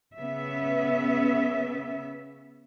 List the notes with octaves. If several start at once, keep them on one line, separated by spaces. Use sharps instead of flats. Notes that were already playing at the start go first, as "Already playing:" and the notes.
C#3 B3 C#4 E5